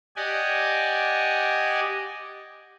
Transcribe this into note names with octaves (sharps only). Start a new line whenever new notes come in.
G4 D5 D#5 F#5 G#5